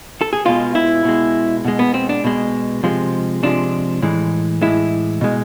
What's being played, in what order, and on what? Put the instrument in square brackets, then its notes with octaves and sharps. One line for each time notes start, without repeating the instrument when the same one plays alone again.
[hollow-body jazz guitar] A4
G#4
B2 G#3 F4
E4
B2 G#3
B2 G#3
B3
C4
D4
B2 G#3
C3 F3 G#3
C3 F3 G#3 D4
A2 E3 G#3
A2 E3 G#3 E4
B2 G#3